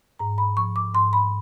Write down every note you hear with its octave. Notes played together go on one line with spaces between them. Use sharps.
G#2 A#5
B5
F3 C#6
D6
G#2 C6
B5